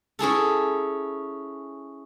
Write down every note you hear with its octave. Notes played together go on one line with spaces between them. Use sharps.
C#4 E4 G#4 A4